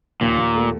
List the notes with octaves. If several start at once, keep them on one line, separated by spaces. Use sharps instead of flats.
D#2 A#2
D#2
A3